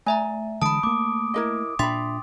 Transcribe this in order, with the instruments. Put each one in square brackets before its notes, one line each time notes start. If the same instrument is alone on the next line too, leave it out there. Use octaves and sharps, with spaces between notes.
[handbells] A3 E5 A#5 [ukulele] G#5
[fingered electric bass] D3 E3 G#3 [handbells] A5 B5 [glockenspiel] D#6 D7
[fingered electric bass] A3 A#3 [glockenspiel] D6
[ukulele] E4 A#4 D#5
[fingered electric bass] A#2 D4 [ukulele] E5 B5 [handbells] G5 C6 A6